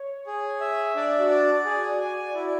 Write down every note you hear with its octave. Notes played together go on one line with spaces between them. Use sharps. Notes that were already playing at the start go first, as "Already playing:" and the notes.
Already playing: C#5
G#4
E5
D4 D5
F#4
D5
G#4
G#5
E4